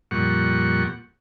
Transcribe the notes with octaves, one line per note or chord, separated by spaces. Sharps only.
F2 A#2 G3 F#5 C#6